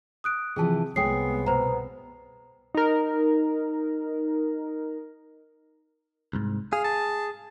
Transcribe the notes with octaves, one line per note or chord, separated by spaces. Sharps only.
D#6 F#6 D7
C3 E3 F3 G#4 A5
C2 G#3 B3 C#5 G5 D#6 C7
B2 B4 C5 A#5
D#4 A#4
C2 G#2
G#4 F5
A5